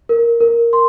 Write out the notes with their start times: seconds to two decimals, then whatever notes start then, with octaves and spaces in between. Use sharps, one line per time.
0.09 A#4
0.40 A#4
0.73 C6